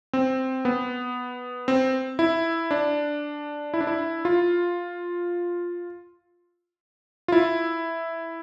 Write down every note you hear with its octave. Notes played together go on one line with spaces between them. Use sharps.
C4
B3
C4
E4
D4
E4
D4
E4
F4
F4
E4